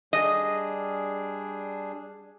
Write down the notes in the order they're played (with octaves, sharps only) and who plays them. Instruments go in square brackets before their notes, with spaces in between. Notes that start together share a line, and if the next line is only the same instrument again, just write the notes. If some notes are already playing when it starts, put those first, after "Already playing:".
[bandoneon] G3 D4 G#4 [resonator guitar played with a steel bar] D#5